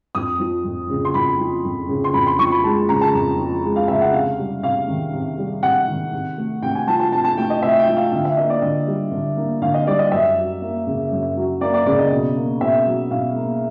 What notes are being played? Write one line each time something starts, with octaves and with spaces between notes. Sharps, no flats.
F2 D#6
F3
F2
C#3
C6
F2 B5
F3
F2
C#3
C6
F2 B5
C6
F3 C#6
B5
G#3 A5
C#3 A#5
A5
F2
F3
G#3
F5
C#3 E5
F#5
C3 F5
G3
C3 F5
D#3
C3
G3
C3 F#5
D#3
C3
A3
C3 G5
G#5
F3 A5
A5
C3 A5
A5
A3 G5
D#5
C3 E5
G5
F3
F5
D3 F5
E5
A#3 D#5
D5
D3 D#5
G3
D3
A#3
D3 F5
D#5
G3 D5
D#5
F#2 E5
F#3
A#3
C#3
F#2
F#3
A#3 D5
D5
C#3 D5
D#5
B2
A#3
B2 E5
F#3
B2 F5
A#3